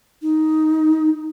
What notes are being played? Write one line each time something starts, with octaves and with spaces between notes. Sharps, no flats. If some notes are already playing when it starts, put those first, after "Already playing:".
D#4